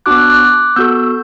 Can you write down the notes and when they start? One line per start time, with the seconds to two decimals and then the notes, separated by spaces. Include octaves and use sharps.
0.06 B3 D4 F#4 D6 F#6
0.17 D6 F#6
0.30 D6 F#6
0.40 D6 F#6
0.76 B3 F#4 A4 E6 G6